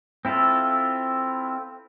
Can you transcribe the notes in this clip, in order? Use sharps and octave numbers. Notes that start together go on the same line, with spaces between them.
C4 E4 F4 A4